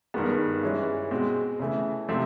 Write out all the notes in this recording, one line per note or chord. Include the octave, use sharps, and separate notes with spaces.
G2 D#3 G#3 B3
G2 E3 G#3 C#4
B2 G#3 C4
C#3 E3 A3
C3 F3 A3 C4